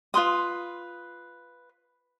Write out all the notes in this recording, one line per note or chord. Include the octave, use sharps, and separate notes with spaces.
F4 B4 C6 D#6